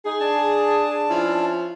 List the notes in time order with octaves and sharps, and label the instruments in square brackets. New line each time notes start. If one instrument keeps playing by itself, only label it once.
[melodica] D#4 [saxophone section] G#4
[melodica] D4 A5
[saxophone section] F3 C#4 E4